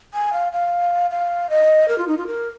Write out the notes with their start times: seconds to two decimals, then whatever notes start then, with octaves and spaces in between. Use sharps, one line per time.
0.14 G#5
0.33 F5
0.52 F5
1.11 F5
1.50 D#5
1.88 A#4
1.98 F4
2.08 D#4
2.17 F4
2.27 A#4